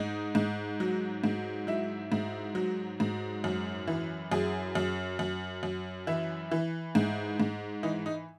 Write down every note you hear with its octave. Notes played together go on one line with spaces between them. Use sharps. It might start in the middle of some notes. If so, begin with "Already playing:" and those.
Already playing: G#2 D#4
G#2
F#3
G#2
F#3 E4
G#2
F#3
G#2
F#2
E3
F#2 G#4
F#2
F#2
F#2
E3 E4
E3
G#2
G#2
E3 D#4
D#4